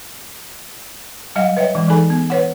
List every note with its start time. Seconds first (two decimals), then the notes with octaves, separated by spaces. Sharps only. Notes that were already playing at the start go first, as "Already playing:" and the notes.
1.35 F#3 G3 D#5 F5 G5
1.57 B4 C#5 D#5 E5 G5
1.75 E3 G#3
1.88 E3 D#4 G#4 A4 G#5 B5
2.10 B3
2.30 B4 C#5 F#5